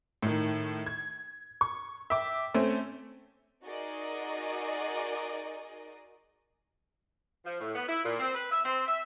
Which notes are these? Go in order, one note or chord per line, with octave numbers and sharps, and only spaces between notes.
A2 D#3
G#6
C#6
E5 G5 D6
A3 C4 C#4
D#4 F#4 G#4 A#4 D5 D#5
F3
A2
B3
E4
A#2
C4
B4
E5
C4
E5